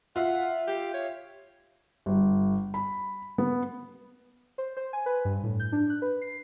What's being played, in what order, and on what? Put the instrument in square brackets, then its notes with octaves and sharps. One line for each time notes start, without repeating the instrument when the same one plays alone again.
[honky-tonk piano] F4 E5 [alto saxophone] F#5
[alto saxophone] G4
C#5
[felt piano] G1
B5
B3
[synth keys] C5
C5
G#5
B4
G2
A2
G6
D4
F#6
B4
C7